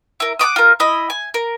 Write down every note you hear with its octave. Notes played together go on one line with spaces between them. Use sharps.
E4 A#4
F#5 A5 D6 D#6
F4 A#4
E4 D#5 B5
G#5
A#4